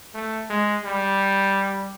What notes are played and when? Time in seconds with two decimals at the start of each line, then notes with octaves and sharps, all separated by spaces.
0.14 A3
0.50 G#3
0.85 G3